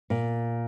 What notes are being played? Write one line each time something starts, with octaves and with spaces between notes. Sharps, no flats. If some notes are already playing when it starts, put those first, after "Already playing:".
A#2